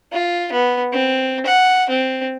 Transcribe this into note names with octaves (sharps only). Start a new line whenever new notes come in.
F4
B3
C4
F#5
C4